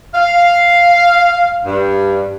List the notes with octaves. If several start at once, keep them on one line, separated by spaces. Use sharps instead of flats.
F5
G2